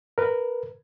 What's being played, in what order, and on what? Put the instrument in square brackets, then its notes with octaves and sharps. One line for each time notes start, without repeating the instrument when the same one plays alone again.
[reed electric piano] A#4 B4